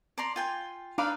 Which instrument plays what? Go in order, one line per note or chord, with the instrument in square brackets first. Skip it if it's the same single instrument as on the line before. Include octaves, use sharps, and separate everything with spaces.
[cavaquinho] D5 A#5 C6
F4 G5 G#5
[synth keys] D4 D5 F5 [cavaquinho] D#4 B4 B5